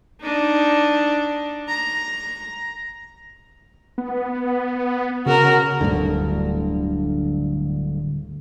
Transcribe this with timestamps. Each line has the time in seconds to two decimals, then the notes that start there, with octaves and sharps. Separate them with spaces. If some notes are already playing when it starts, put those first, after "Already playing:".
0.22 D4 D#4
1.69 A#5
3.98 B3
5.26 C#3 F#4 A#4
5.81 D1 D2 G2 D3